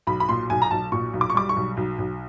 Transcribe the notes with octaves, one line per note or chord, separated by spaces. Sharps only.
B1 B5
B5
A#2 C6
B1 G#5
A#5
B1 A5
A#2 C#6
B1
D6
C#6
G3 D6
C#6
B1
B1
B1